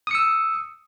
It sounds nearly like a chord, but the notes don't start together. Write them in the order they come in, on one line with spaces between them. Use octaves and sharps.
D#6 C#7 E6